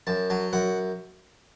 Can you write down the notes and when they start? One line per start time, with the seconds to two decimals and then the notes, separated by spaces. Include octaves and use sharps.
0.07 F#2 A5
0.30 F#3 A5
0.53 F#2 F#5